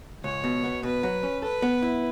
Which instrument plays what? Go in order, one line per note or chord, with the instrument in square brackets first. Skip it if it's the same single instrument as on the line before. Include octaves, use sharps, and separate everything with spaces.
[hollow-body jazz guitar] C#2 [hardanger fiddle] C#5
[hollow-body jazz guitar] B2
B3
[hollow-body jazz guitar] B2 [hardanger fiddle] B4
[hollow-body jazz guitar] F#3
C#4
[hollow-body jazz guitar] A4 [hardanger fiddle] B4
[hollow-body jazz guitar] B3
E4